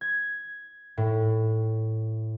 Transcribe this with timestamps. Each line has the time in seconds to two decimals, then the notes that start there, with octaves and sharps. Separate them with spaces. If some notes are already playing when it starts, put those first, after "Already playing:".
0.01 G#6
0.97 A2